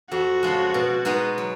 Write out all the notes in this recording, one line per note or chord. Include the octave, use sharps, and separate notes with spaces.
F2 F#4
C#3 F3 G#3
B2
G#3 B3 D#4 F#4
F#3